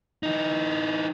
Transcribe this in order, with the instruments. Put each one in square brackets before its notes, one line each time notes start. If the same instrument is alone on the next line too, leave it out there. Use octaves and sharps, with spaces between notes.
[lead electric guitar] E3 D#4